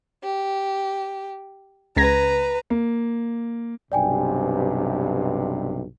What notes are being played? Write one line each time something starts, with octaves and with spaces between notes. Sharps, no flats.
G4
C#2 B4 A#5 G#6 A#6
A#3
B1 G2 C3 D5 G5 G#5